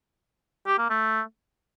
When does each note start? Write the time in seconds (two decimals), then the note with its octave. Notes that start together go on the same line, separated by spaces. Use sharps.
0.67 G4
0.78 A#3
0.90 A3